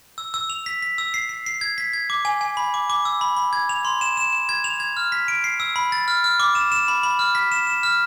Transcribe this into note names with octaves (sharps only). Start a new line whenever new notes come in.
E6
E6
F7
B6
B6
E6
C7
C7
C7
G#6
B6
G#6
D6
G#5
G#5
B5
D6
D6
E6
B5
B5
G#6
F7
C6
E7
E7
E7
G#6
F7
G#6
F6
B6
D7
C7
E6
B5
A6
F6
F6
D6
E7
E7
B5
B5
F6
B6
E7
E7
F6